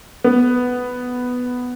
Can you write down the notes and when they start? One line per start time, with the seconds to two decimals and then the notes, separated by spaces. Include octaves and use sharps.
0.24 B3